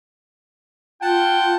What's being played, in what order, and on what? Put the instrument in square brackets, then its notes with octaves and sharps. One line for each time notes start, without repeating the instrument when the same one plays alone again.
[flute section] F4 [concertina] F#5 A5 [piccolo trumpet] G5